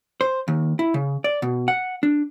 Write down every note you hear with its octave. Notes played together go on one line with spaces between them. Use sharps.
C5
D#2
E4
C#3
D5
B2
F#5
D4